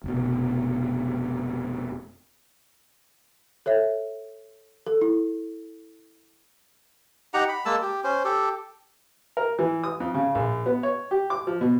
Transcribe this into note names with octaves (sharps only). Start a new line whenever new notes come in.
F1 B2
A4 C#5 E5
A4
E4
D#4 G4 F#5 A#5
B5
G#3 A#3 A5 E6
G4
C#4 C5
G4 A4
A#4
E3
D#6
F2
C#3
A#1
B3
C#5
G4
D6
F3
B2